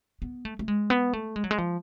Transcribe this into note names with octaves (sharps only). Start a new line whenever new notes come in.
B3
A3
A3
G#3
B3
A3
G#3
F#3
G#3
F3